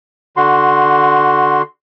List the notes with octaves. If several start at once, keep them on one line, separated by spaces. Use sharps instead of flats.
D3 F#4 C6